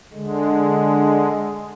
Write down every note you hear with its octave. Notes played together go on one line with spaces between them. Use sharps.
D3 G#3